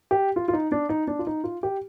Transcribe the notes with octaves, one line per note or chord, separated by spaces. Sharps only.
G4
F4
F4
D#4
D4
D#4
D4
F4
D#4
F4
G4